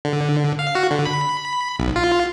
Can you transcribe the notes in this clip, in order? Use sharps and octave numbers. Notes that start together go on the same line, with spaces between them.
D3
F5
F#4
D3
B5
B1
F4